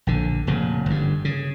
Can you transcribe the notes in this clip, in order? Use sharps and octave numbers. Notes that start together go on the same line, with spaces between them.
A#1 D3
F1 A#2 C#3
G1 G2
C#3